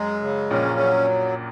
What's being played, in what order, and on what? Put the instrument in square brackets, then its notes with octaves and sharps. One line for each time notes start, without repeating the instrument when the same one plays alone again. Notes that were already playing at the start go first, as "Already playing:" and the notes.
Already playing: [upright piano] F#2 F#3 [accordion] G#3
[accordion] C#3
[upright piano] A#1 A#2 [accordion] C#4
[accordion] F#3